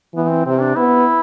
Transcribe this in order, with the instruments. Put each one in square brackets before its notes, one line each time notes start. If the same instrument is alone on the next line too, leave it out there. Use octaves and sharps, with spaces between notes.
[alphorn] E3 [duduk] B3
[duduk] C4
[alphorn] C3 [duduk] C4
[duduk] D4
[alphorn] B3 [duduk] E4